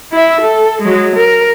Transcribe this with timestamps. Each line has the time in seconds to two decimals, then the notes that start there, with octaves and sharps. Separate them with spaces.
0.12 E4 E5
0.41 A4
0.82 F#3 G#3
1.16 A#4